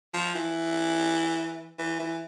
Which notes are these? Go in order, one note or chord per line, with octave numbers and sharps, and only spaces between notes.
F3
E3
E3
E3